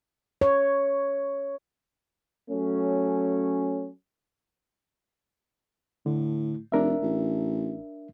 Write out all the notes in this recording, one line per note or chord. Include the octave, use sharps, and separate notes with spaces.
C#5
F#3 A3 C#4
A2 D3
F1 D4 A#4 E5
A1